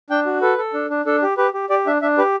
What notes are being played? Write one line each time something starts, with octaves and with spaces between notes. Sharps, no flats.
D4 G5
F#4
A4 B4
A4
D4
D4
D4 A4
G4
G4 B4
G4
G4 D5
D4 E5
D4 E5
G4 B4